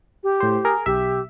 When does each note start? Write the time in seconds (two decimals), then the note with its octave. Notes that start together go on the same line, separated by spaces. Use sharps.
0.23 G4
0.40 A2 C5
0.65 G#4 A#4
0.86 B1 G4 E5